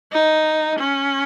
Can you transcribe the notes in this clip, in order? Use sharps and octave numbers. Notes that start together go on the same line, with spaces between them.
D#4
C#4